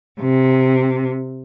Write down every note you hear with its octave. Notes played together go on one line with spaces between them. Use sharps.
C3